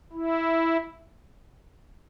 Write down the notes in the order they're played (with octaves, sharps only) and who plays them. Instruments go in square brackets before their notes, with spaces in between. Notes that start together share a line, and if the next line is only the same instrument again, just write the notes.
[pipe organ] E4